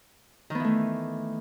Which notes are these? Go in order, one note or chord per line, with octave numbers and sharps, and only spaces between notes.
D#3 E3 A3 B3